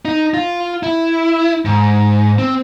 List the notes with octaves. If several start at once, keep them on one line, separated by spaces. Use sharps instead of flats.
D#4
F4
E4
G#2
C4